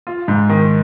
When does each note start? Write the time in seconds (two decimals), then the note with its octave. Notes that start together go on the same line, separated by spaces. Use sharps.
0.07 F4
0.28 G#2
0.49 D#3